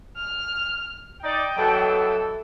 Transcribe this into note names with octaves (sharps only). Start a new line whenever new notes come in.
F6
D#4 D5 G5
B2 E3 F#3 A4